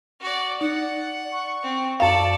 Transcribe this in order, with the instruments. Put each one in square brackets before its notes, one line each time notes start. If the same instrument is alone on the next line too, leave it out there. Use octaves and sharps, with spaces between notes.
[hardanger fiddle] F#4 D5
[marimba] D#4 [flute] D5 [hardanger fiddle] F#5
[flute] C#6
[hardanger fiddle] C4
[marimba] F#2 F5 [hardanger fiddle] A4 D5 [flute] A5